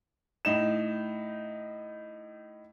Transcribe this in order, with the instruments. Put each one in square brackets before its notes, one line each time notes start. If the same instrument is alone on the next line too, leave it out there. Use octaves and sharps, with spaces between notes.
[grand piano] A2 D#4 E7